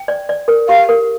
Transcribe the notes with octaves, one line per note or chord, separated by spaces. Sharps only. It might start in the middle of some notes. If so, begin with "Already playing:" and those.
Already playing: G5
D5
D5
A#4
G4 F5
A#4